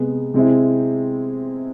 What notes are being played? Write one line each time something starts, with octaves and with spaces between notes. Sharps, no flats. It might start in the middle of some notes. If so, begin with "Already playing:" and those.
Already playing: C3 G#3 B3
C3 G#3 C4 E4